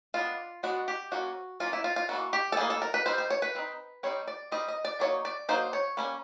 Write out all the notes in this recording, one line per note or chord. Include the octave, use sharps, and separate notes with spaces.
G#3 B3 D4 F4
G#3 B3 D4 F#4
G4
F3 A#3 C#4 F#4
F3 A#3 C#4 F4
E4
F4
F4
E3 G3 A#3 F#4
G4
A4
E3 G3 A#3 G#4
A4
A#4
B4
G3 C4 D#4 C5
C5
C#5
B4
G3 C4 D#4
G3 C4 D#4 C#5
D5
G3 C4 D#4 D#5
D#5
D5
F#3 A#3 D#4 C#5
D5
F#3 A#3 D#4 C5
C#5
G3 A#3 C#4